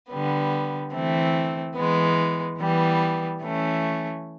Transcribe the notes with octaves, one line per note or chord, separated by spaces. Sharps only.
D3 G3 B3
E3 A3 C4
E3 G#3 B3
E3 G3 B3
E3 A3 C#4